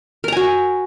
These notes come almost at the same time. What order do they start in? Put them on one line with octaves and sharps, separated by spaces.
A#4 A#5 G#5 F#4